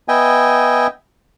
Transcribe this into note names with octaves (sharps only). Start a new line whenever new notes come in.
B3 D#5 E5 G5 G#5